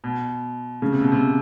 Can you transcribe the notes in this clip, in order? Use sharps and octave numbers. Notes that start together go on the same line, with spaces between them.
B2
C#3
C3
B2
C3